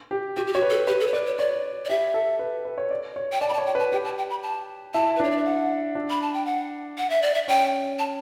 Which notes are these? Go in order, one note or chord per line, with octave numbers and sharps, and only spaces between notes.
G4
F#4 G4
G4
F#4 C#5
B4
A4
G4 B4
A4
C#5
B4 D5
C#5
C#5 D5
D5
G4 E5
A4
B4
B4
C#5
D5
C#5
G5
D5 A5
B5
D5 A5
C#5
G5
B4
A5
G4 G5
A5
G5
B5
A5
E4 A5
B4
D4 C#5
D5
E5
F#5
D4
B5
A5
G5
F#5
F#5
E5
D5
E5
C#4 G5
A5